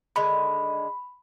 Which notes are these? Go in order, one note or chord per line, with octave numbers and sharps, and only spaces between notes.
D3 D#3 G#3 B5